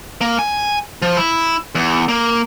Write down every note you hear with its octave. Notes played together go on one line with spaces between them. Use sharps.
A#3
G#5
F3
E4
E2
A#3